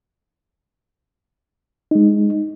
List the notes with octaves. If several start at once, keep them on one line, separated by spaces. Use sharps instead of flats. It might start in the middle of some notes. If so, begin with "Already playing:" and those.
G#3 D#4